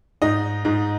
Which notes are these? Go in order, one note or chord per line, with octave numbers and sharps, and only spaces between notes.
G#2 D#4 D#5
G#2